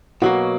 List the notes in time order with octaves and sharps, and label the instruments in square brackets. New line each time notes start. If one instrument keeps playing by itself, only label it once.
[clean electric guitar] B2 F#3 A#3 [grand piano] F#4